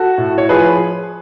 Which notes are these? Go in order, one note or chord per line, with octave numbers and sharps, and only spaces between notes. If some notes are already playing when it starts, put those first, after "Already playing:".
Already playing: F#4 A4
A2
C#5
F3 G#4 B4